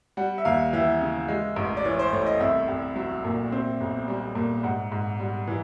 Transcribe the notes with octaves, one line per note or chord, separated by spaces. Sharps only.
G3 F#5
E5
D#2 F5
E3 E5
C#3
G#3
A1
D5
E3 C#5
C5
A2 C#5
D#5
C2 E5
C2
F#3
A#2
C4
B1
G3
A#2
G#2 F#5
G#2
G3
E3